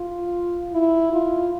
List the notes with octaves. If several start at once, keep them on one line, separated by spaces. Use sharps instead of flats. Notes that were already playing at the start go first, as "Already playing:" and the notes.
Already playing: F4
E4
F4